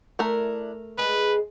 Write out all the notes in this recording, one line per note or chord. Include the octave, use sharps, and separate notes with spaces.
A3 D4 E4 A#4
G#3 D4 G#4 B4